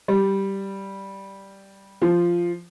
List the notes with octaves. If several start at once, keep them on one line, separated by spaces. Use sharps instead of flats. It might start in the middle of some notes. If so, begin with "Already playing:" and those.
G3
F3